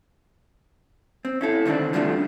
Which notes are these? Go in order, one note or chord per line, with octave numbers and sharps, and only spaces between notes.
C4
C#4 E4 A4
D3 D#3 A3 C4 D4
D3 F3 G3 A3 C4 D4